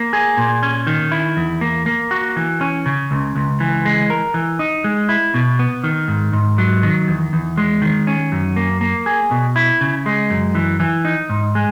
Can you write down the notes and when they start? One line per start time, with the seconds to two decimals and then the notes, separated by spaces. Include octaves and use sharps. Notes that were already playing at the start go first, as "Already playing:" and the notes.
Already playing: A#3
0.13 G#4
0.37 A#2
0.63 C#4
0.87 D#3
1.12 E4
1.37 E2
1.61 A#3
1.86 A#3
2.11 F#4
2.36 E3
2.61 C#4
2.86 C#3
3.11 C#2
3.35 C#2
3.60 E3
3.85 G#3
4.10 A#4
4.34 E3
4.59 D#4
4.84 G#3
5.09 E4
5.34 B2
5.59 B3
5.84 D#3
6.08 G#2
6.33 G#2
6.58 F#3
6.83 D#3
7.08 E2
7.33 E2
7.57 G#3
7.82 D#3
8.07 C#4
8.32 F#2
8.56 A#3
8.81 A#3
9.06 G#4
9.31 B2
9.56 E4
9.81 C#3
10.06 G#3
10.30 F#2
10.55 E3
10.80 E3
11.05 D#4
11.29 G#2
11.55 G#3